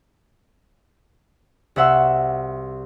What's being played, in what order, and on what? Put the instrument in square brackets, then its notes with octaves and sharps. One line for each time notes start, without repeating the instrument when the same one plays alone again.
[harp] C2 F#4 E5 F#5 C6 E6